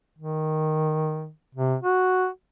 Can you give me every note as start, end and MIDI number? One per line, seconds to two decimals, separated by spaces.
0.18 1.30 51
1.55 1.76 48
1.83 2.27 66